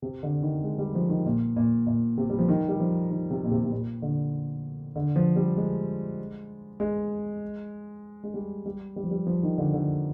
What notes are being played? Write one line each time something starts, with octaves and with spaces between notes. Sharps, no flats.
C3
D3
D#3
G#3
G3
F3
D#3
A#2
A#2
A#2
C3
G3
F3
D#3
G3
F3
D#3
C3
A#2
C3
C3
A#2
D3
D3
F3
G3
G#3
G#3
G#3
G3
G3
G3
F3
G3
F3
D#3
D3
D3